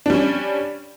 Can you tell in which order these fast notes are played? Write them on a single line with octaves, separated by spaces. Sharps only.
D4 G3 C#4